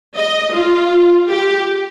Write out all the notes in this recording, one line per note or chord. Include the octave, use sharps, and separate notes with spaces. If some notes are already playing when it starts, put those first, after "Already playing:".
D#5
F4
G4